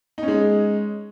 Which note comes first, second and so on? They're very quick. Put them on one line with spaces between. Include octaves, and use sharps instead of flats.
D#4 C#4 G#3